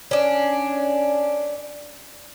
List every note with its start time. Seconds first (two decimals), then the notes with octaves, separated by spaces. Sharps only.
0.11 C#4 D4